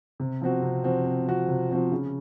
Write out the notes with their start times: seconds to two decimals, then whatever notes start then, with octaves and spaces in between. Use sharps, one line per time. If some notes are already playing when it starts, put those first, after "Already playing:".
0.20 C3
0.41 F3 C4 F#4
0.62 C3
0.84 F3 C4 F#4
1.05 C3
1.27 F3 C4 F#4
1.48 C3
1.70 F3 C4 F#4
1.92 C#3